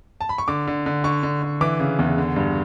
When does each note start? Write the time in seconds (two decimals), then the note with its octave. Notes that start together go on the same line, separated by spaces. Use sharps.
0.21 A5
0.29 B5
0.38 C#6
0.48 D3 D6
0.68 D3
0.86 D3
1.04 D3 C#6
1.23 D3
1.42 D3
1.61 E3 D6
1.80 C#3
1.99 E2
2.18 D3
2.36 G2